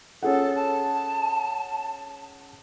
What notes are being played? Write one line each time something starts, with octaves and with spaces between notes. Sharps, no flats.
C#4 G#4 A4 F#5
A5